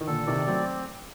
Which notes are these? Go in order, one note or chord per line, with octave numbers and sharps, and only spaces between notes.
D#3
A#2 D3 A4
C3 D#3 D5
F#3 A3 C4